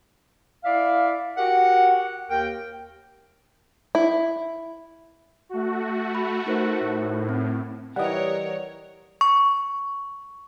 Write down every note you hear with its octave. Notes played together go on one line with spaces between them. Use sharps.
E4 D5 E5 F5
F#4 G4 A#4 F#5
D#2 A#4 G5
E4
A3 F#4
B5
D#4 A#4 C5
A2
C4
E3 G3 A#4 C#5 D#5 F#5
C#6